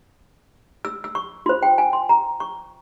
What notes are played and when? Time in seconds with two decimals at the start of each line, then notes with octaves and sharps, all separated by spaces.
0.85 E6
1.04 E6
1.15 C#6
1.46 F4 C6
1.49 C5
1.63 G5
1.78 G#5
1.93 C6
2.09 A#5
2.40 C#6